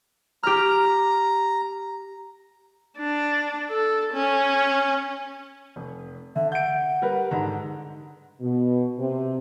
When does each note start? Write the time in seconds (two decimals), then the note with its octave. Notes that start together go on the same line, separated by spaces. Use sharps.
0.43 G4 A#5 F6
2.97 D4
3.69 A4
4.13 C#4
5.76 F1
6.36 D3 E5
6.52 F#5 G6 D7
7.02 G3 A#4 B4
7.31 G#2 D3 A#5
8.41 B2
8.99 C3